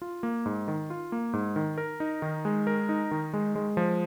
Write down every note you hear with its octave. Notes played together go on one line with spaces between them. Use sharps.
F4
A#3
G#2
D#3
F4
A#3
G#2
D#3
A#4
D#4
D#3
G#3
A#4
D#4
D#3
G#3
G#3
F3